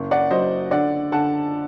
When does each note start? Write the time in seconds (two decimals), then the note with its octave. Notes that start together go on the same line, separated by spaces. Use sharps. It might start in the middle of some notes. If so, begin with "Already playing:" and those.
Already playing: F#1
0.11 D5 F#5
0.31 F#3 C5 D#5
0.71 D3 D5 F#5
1.12 D3 F#5 A5